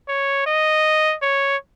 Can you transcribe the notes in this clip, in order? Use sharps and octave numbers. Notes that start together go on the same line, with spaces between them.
C#5
D#5
C#5